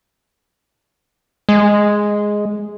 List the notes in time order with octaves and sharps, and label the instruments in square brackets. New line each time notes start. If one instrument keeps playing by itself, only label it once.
[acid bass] G#3